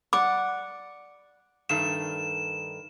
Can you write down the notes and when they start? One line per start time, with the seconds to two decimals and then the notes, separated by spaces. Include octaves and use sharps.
0.13 D5 F#5 D6
1.69 G2 D#3 A3 E7